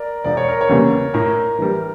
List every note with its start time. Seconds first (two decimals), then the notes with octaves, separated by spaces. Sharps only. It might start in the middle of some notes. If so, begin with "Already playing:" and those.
Already playing: A#4 D5
0.24 E1 D5
0.37 C#5
0.49 A#4
0.61 C#5
0.69 E2 C#3 G3 A#3
1.14 A2 A#4
1.59 E3 G3